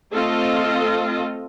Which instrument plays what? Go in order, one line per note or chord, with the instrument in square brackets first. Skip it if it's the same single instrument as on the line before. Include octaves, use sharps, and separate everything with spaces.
[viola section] A3 C4 F4 A4 D#5